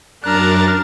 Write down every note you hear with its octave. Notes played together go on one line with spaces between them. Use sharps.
F#2 D4 A#4 A#5 F6 F#6 A6